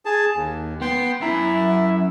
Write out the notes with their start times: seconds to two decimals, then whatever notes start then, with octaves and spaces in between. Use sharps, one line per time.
0.05 G#4 A5
0.36 D#2
0.81 B3 G5 C6
1.21 F#2 E4 E5 A#5